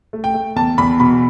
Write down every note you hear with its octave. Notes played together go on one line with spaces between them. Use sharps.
A3
G5
A3
E2 A5
E2 B5
B2 B5